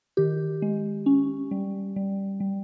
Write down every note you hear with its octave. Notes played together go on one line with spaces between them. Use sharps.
D#3 G4
G#3
C#4
G3
G3
G3